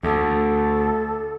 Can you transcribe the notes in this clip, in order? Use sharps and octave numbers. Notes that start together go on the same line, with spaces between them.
D2 A4